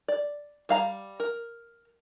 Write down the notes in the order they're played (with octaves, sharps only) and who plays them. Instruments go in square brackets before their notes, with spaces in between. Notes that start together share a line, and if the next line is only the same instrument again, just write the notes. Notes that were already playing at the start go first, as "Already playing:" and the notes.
[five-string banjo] D5
G3 F5 A#5
A#4